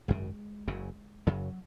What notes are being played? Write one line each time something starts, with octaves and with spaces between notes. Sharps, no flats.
G#1 F#2 C#3 G#3
F#1 F#2 C#3
F#1 F#2 C#3 F#3